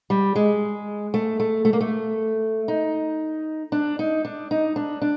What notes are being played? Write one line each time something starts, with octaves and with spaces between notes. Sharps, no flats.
G3
G#3
A3
A3
A3
A#3
A3
D#4
D4
D#4
D4
D#4
D4
D4